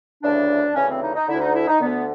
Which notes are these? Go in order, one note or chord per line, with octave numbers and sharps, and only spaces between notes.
D2 C#3 E3 D4
D2 C#3 E3 C#4
C4
D#4
D#4
D2 D3 E4
D#4
E4
D#4
D2 D3 B3